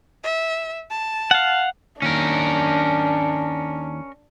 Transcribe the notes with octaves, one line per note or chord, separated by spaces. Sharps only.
E5
A5
F5 F#5
D#2 C#4 D4 A#4